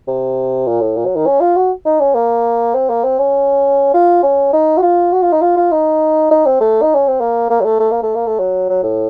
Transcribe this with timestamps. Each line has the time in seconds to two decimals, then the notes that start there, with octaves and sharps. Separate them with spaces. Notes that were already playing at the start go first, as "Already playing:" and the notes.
0.07 C3
0.67 A#2
0.81 A2
0.96 A#2
1.06 F#3
1.16 D#3
1.26 C#4
1.41 F4
1.56 F#4
1.85 D#4
2.00 C#4
2.15 A#3
2.75 C4
2.89 A#3
3.04 C4
3.19 C#4
3.93 F4
4.23 C#4
4.53 D#4
4.77 F#4
4.82 F4
5.12 F#4
5.22 F4
5.32 D#4
5.41 F4
5.57 F4
5.72 D#4
6.31 D#4
6.46 C4
6.60 A3
6.82 D#4
6.94 C#4
7.07 C4
7.20 A#3
7.50 A#3
7.60 F#3
7.65 A3
7.80 A3
7.91 A#3
8.03 A3
8.15 A#3
8.27 A3
8.39 F#3
8.69 F#3
8.83 A2